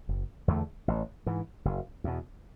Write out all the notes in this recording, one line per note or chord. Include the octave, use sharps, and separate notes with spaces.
F#1
E2 D3 A3
A1
G#2 E3
F#1
E2 B2